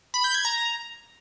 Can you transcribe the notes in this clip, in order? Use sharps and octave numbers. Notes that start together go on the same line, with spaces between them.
B5
G6
G#6
A#5